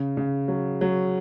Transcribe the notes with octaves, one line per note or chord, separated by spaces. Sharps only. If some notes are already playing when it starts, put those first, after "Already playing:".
Already playing: C#3
C#3
F#3
F#3